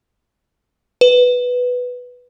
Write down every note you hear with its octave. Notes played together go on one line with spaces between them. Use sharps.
B4